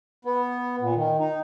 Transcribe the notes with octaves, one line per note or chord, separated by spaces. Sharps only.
B3
A#2
D#3
D#4